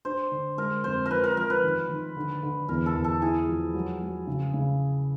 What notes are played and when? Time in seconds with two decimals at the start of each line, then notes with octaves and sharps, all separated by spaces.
0.05 D4 C5
0.31 D3
0.57 G#3 A#4
0.84 F2 C5
1.06 A#4
1.11 F3 B4
1.24 A#4
1.37 F3 A#4
1.50 B4
1.63 D#3
1.89 D#3
2.17 D3
2.43 D3
2.68 E2 A#4
2.86 A4
2.95 E2
3.04 A4
3.22 E4 G#4
3.48 F3
3.74 F#3
4.02 F#3
4.27 C#3
4.54 C#3